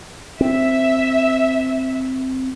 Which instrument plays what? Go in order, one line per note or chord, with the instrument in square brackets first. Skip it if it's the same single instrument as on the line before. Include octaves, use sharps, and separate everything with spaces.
[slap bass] C4 [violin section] E5